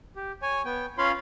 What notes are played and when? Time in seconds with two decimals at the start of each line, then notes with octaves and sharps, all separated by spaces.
0.16 G4
0.42 C#5 G#5
0.65 B3 G5
0.98 C#4 F4 C#5 F5 B5 C6